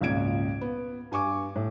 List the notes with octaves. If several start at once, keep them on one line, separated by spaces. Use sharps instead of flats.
G#1 C#2 A#2 G#6 D7
B3
G2 G#5 C#6 D6
A2